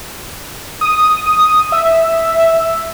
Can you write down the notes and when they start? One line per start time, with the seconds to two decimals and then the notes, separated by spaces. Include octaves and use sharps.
0.81 D#6
1.72 E5